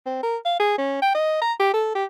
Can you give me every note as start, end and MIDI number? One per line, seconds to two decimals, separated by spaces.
0.06 0.21 60
0.23 0.37 70
0.46 0.60 77
0.60 0.76 68
0.78 0.98 61
1.02 1.13 79
1.15 1.41 75
1.42 1.53 82
1.60 1.72 67
1.74 1.91 69
1.95 2.05 67